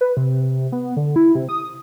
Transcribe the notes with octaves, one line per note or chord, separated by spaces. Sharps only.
B4
C3
B3
D3
E4
C3
D#6